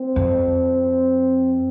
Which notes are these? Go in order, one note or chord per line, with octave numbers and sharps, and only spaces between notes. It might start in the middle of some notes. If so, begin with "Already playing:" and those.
Already playing: C4
F2